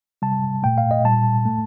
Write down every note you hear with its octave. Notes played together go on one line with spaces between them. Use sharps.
C3 G3 A5
A#2 A3 G5
F5
D#5
A#2 G3 A5
A2 A3